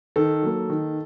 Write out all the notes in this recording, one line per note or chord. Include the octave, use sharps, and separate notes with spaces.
D#3 A4
F#3 A#3
D#3